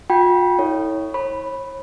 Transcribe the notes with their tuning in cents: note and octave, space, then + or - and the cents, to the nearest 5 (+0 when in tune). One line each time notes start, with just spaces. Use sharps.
F4 +40 G5 +0 B5 -30
E4 -35 A4 +20 C#5 +0
C#5 -40 B5 +0